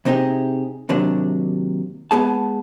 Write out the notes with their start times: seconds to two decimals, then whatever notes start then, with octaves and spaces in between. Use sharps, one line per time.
0.05 C3 C4 D#4 G4 G#4
0.89 D#2 C3 F#3 D4
2.11 G#3 B3 G#4 A5